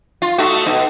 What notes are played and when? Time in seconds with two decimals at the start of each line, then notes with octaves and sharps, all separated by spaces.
0.22 F4
0.38 A3 D#4 F#4
0.66 B2 D#4